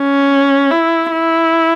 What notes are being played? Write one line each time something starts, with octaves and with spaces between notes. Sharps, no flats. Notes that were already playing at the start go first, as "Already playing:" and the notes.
Already playing: C#4
E4
E4